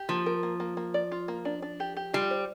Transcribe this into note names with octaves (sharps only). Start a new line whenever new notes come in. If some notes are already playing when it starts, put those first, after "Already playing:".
Already playing: G4
F3 A#3
A#4
A#3
A#3
A#3
D5
F4
A#3
D4
D4
G4
G4
G3 F4
C5